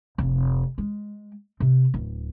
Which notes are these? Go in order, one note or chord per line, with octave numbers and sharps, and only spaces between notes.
F1
G#3
C3
D1